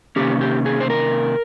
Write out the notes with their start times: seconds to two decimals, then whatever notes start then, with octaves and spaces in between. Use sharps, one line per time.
0.16 C3 D#3 A#3 C#4 G4
0.41 G4
0.66 G#4
0.80 C5
0.90 A#4